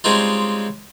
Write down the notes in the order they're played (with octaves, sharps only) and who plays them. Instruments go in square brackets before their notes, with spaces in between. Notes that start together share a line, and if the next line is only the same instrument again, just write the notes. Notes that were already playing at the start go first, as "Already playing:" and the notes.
[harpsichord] G3 G#3 C4 C#4 D#4 F4